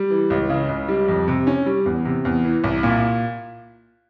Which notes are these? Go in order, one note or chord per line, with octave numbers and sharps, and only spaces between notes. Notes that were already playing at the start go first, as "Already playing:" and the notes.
Already playing: G3
E3
C#2
C#3
C#2
G3
F2
C3
C#4
G3
E2
C3
E2
E3
C2
A#2